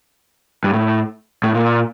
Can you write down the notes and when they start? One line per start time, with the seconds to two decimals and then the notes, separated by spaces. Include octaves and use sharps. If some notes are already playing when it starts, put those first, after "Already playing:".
0.64 G2
0.73 A2
1.44 A2
1.54 A#2